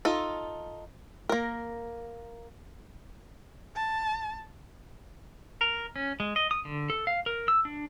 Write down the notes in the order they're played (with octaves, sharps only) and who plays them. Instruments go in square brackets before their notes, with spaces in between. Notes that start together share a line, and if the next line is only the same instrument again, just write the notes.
[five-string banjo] D#4 F4 A4
A#3 A#4
[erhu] A5
[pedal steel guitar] A#4
C#4
G#3
D#5
D#6
D3
A4
F5
A#4
E6
D4